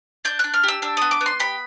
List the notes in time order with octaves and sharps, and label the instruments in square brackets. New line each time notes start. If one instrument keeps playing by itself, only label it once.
[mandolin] D4 G6
D4 F#6
F6
G4 E6
D4 E6
B3 D#6
D6
B3
C6
G4 B5